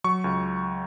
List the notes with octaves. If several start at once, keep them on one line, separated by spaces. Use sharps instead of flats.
F#3 C#6
C#2